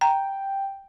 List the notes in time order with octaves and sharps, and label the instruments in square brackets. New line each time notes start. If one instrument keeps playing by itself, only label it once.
[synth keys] G5 [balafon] A#5